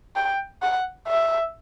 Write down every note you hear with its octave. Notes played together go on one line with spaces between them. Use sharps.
G5
F#5
E5